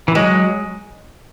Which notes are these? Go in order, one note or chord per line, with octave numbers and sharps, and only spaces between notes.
E3
F#3 G#3